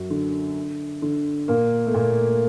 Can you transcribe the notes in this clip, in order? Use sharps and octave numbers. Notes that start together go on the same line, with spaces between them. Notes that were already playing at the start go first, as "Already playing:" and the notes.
Already playing: F#2 F#3
D3
D3
A#2 A#3
A3
A#2 A#3